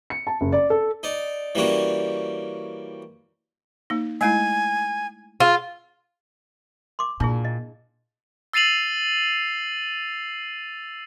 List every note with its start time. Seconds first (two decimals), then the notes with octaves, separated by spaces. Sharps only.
0.10 C#7
0.27 A5
0.41 F#1
0.53 D5
0.70 A4
1.03 D#4 D5
1.55 E3 G3 A#3 C#4 F#4
3.90 A#3 D#4
4.21 G#3 A3 E4 G#5
5.40 F4 G#4
6.99 C6 D6
7.20 A#2 D4 E4 G#4
7.45 D#5
8.53 E6 A6 C7 D#7 F7 F#7